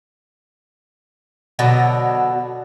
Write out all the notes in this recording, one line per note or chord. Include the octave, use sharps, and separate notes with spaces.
B2 D3 F#3